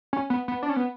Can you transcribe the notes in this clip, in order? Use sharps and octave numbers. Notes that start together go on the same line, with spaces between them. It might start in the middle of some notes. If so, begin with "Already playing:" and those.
C#4
B3
B3
D4
C#4
B3